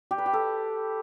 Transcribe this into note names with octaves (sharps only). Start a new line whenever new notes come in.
G4
B4
G4
A4